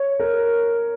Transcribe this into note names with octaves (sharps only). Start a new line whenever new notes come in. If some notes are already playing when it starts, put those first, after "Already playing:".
Already playing: C#5
A#4